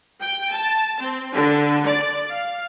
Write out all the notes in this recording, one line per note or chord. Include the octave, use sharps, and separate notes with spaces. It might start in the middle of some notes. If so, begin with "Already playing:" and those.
G5
A5
C4
D3
D5
F5